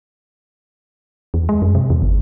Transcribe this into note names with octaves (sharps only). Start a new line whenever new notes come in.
E2
G#3
F#2
C3
E2
G1